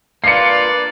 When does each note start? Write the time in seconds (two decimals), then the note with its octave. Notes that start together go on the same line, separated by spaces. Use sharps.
0.24 A#3 D4 F4 B4 D5 C7 C#7